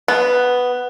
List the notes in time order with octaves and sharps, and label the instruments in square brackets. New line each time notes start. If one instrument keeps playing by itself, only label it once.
[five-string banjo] B3